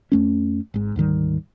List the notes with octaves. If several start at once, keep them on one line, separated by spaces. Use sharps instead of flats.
F2 A3 C#4
G#1 G#2
D2 G#2 D#3 G3